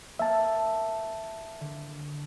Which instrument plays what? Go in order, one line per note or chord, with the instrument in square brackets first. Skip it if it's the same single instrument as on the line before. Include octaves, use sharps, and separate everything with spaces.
[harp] A#3 [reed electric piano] E5 A5
[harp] D3